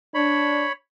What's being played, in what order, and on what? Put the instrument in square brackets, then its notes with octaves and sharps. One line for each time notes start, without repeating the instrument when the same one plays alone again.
[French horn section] D4 [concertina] C#5 B5